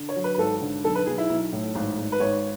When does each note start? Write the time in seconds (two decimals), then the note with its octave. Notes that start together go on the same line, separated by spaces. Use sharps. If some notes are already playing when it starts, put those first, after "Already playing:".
Already playing: D3
0.09 C#5
0.16 F#3
0.24 B4
0.35 B4
0.38 G#1 A4
0.62 D3
0.84 B1 A4
0.95 B4
1.06 B1 G#4
1.18 E4
1.29 B1
1.52 A2
1.75 G#1
1.98 G#1
2.12 B4
2.20 G#1 C#5